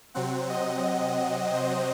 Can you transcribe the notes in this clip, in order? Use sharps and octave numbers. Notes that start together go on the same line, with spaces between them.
C3 F#3 C4 F#5
D#5
C5